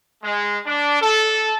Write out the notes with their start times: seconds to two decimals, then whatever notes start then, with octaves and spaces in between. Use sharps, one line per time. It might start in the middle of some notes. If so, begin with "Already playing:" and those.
0.22 G#3
0.66 D4
1.01 A4